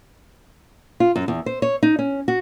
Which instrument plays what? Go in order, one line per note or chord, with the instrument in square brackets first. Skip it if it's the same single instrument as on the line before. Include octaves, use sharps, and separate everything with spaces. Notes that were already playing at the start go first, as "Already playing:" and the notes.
[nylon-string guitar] F4
F#2
E2
C5
C#5
D#4
C#4
F#4